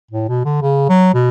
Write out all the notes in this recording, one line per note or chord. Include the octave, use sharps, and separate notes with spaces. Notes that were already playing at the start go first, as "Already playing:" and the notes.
A2
B2
D3
C#3
F#3
B2